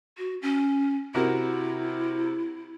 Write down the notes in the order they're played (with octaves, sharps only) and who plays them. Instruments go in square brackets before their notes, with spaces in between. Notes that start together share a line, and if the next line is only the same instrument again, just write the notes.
[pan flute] F#4
C#4
[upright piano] C3 F#4 A#4 [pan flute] E4